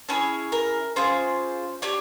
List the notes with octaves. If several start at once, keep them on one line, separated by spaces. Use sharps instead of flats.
C#4 E4 G#4 C#5
A#4
C#4 F4 G#4 C5
D4 G4 C#5